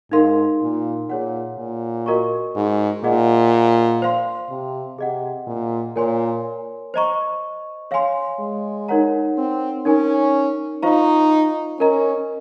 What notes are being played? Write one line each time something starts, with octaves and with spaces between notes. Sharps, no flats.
G#2 D#4 A#4 F5 C6
A#2
A#2 G#4 C#5 F#5
A#2
F#4 A#4 D#5 A#5 C#6
G#2
A#2 G#4 D#5 F#5
C5 F5 C6
C3
C3 G#4 D#5 F#5
A#2
A#2 A#4 C#5 G#5 C6
C5 D#5 A#5 C#6
C#5 F5 G#5 C6
G#3
D#4 A#4 C#5 F#5 A#5
C4
C#4 D#4 A#4 C#5 G#5
D#4 F4 C5 F5 A#5 C#6
C#4 A#4 D#5 A#5